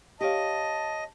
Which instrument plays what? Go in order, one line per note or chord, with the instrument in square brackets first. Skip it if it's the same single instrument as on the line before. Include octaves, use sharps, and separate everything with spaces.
[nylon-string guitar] G4 C#5 F5 [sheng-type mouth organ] D#5 [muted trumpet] A5